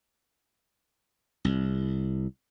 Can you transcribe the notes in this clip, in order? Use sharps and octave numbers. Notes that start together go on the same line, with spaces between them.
C2